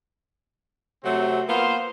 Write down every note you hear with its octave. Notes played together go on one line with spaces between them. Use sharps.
C3 F#3 A3 C4
A#3 B3 F4 C5